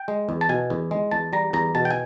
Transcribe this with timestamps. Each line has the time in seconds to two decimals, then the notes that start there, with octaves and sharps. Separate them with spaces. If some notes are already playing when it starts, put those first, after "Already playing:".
Already playing: G5
0.08 G#3
0.29 E2
0.41 A5
0.49 B2 G#5
0.70 E2
0.91 G#3
1.11 E2 A5
1.33 G3 A#5
1.53 E2 A#5
1.75 B2 A5
1.85 G5
1.91 G#5